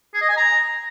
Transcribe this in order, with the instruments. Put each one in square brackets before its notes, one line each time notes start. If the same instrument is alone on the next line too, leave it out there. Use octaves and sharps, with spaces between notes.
[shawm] G#4
D#5
G#5
A#5